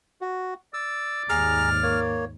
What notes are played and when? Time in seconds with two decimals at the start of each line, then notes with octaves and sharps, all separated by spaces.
0.21 F#4
0.74 D5 E6
1.29 D#2 G#2 G#4 A#5 F6
1.83 A#3 C#5